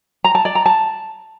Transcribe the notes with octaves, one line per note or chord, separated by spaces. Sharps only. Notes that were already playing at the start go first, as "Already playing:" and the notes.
A#5
A5
D5
A#5
A5